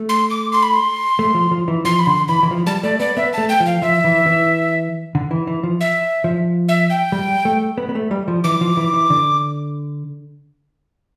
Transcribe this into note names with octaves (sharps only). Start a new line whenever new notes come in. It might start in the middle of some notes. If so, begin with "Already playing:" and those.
Already playing: A3
C6
D6
C6
B5
C6
A3
F3
F3
E3
F3 C6
B5
D3 C6
E3 B5
E3
F3
G3 A5
A3 D5
B3 D5
B3 E5
A3 A5
G5
F3
F5
F3 E5
E3
E3
D3
E3
E3
F3
E5
F3
E5
G5
G3
A3
B3
B3
A3
G3
F3
E3 D6
F3
E3
E3
D3